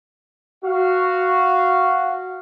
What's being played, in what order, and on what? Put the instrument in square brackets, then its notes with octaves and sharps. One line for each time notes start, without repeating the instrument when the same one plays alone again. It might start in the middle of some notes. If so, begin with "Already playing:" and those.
[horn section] F#4 F5